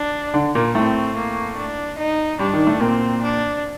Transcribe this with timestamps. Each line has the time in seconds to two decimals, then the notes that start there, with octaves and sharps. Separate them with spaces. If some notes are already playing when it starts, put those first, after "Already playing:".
Already playing: D4
0.34 D3 D4
0.55 A#2 A#3
0.75 A2 A3 C4
1.16 A#3
1.57 D4
1.99 D#4
2.39 G2 G3 D4
2.53 D#3
2.67 A2 A3
2.80 A#2 A#3 C4
3.22 D4